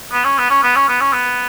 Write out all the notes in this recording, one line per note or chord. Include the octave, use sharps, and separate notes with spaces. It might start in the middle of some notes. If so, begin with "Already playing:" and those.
B3
C#4
B3
C#4
B3
C#4
B3
C#4
B3